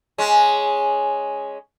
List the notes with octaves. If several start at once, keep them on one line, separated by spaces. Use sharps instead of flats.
G#3 C#4